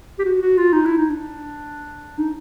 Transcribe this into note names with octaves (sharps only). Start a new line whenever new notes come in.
G4
F#4
F#4
F4
D#4
E4
D#4
D4
D#4